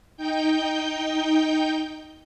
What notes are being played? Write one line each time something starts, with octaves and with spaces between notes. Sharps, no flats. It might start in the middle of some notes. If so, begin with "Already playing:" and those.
D#4 G5 G6